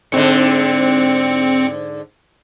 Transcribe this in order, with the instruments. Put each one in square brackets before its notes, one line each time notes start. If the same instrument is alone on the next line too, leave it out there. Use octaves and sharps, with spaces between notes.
[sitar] G#2 D3 [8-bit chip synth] C4 C#7